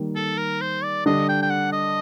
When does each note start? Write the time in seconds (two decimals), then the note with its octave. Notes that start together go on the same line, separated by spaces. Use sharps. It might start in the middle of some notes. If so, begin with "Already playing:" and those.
Already playing: D#3 G3 A#3
0.16 A4
0.38 A#4
0.61 C5
0.84 D5
1.06 D3 G3 D4 D#5
1.29 G5
1.43 G5
1.50 F#5
1.73 D#5